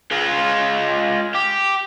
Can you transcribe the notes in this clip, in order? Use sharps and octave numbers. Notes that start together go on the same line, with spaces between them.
G#3 F4
G4